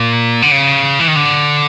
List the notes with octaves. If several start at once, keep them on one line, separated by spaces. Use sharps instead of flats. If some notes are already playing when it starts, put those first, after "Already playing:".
Already playing: A#2
D3
C#3
E3
D#3
D3